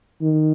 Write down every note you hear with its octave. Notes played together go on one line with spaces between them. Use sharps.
D#3